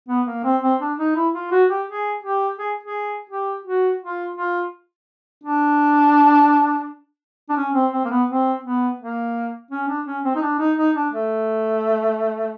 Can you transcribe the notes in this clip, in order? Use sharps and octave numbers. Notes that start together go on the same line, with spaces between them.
B3
A#3
C4
C4
D4
D#4
E4
F4
F#4
G4
G#4
G4
G#4
G#4
G4
F#4
F4
F4
D4
D4
C#4
C4
C4
A#3
B3
C4
B3
A#3
C#4
D4
C#4
C4
D#4
D4
D#4
D#4
D4
A3